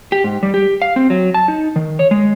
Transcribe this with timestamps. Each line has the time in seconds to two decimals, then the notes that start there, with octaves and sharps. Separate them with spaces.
0.12 G4
0.24 G#2
0.43 G3
0.54 G4
0.82 F5
0.96 C4
1.10 F#3
1.34 A5
1.48 D#4
1.76 D#3
1.99 C#5
2.11 G#3